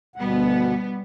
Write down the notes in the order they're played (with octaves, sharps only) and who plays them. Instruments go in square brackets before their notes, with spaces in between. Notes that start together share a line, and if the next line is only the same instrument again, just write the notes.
[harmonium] D2 B2 F#5 [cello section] G3 B3